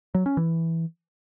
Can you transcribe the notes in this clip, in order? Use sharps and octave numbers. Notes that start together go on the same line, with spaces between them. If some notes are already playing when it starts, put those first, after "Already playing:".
F#3
C#4
E3